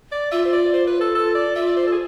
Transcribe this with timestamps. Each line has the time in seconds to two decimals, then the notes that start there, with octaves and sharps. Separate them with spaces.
0.12 D5
0.31 F4 E5
0.45 C5
0.53 D5
0.73 C5
0.87 B4
1.01 A4
1.15 A4
1.35 D5
1.56 F4 E5
1.66 D5
1.77 C5
1.87 A4
1.92 G#4